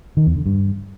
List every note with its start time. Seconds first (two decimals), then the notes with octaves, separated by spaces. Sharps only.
0.17 D#3
0.26 E2
0.36 D3
0.46 G2